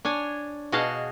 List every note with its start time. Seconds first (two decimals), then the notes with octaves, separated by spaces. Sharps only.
0.05 D4 C#5 G#5
0.72 B2 F#4 G#4 D#5 F5 A5